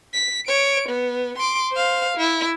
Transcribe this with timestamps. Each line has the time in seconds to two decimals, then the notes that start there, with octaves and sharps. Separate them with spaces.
0.14 B6
0.47 C#5 D7
0.88 B3
1.38 C6 D6
1.72 C5 F5
2.17 E4